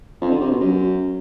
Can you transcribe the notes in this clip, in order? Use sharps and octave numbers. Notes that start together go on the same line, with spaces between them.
F2
D3
C3
B2
F#2